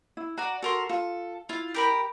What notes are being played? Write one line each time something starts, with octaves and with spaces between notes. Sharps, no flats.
E4
F#4 D5 A#5
F#4 A4 A#4 C6
F4 A4
E4 F4
G4 A#4 B5